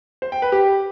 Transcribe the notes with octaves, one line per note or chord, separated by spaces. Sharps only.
C5
G5
B4
G4